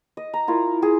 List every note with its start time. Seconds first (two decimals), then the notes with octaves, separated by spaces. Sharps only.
0.17 D#5
0.34 A#5
0.48 E4 F4 A#4
0.82 G#4